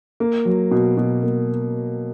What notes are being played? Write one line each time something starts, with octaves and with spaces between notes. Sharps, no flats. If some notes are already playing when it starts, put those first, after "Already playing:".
A#3
F#3
B2
B2
A#3